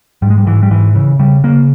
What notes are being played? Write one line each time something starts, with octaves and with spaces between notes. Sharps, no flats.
G#2 G3
G#3
G3
G#2 E3
G3
G#2 E3
C#3 E3
C#3 G3
C#3 A#3